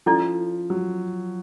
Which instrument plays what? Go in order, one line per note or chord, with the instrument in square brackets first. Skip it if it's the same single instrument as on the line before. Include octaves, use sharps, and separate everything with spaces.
[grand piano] F3 [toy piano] C#4 E4 A4 D5
[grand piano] F#3